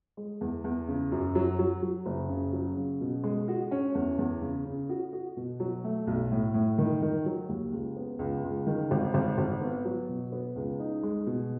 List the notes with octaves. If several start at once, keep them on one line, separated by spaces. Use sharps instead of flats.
G#3
E2
E2
C#3
F#2
F#3
F#3
F#3
F#1
C#3
F#3
C#3
B2
G#3
F#4
C#4
E2
E2
C#3
C#3
F#4
F#4
B2
F#3
A3
B1
A2
A2
D#3
D#3
F#3
D#2
C#2
B3
C#2
C#2
D#3
G#1
G#1
G#1
B3
F#3
B2
B3
C#2
D#4
G#3
B2